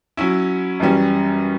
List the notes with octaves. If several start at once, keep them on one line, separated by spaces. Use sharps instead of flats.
F#3 C#4 E4
F#2 E3 G3 C#4